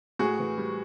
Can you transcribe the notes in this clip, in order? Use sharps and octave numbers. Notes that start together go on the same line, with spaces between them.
A2 F#4 G#4
E3
G3